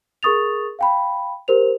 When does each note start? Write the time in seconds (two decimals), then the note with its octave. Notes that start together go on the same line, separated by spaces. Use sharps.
0.23 G#4 A#4 C#6 D#6 A6 F7
0.79 F5 G5 B5
1.48 G4 A#4 C5 F7